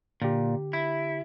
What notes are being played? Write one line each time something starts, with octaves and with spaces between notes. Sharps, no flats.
A#2 D3 G4
E4